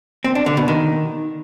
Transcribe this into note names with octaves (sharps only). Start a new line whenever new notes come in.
C4
D4
D3
B2
D#3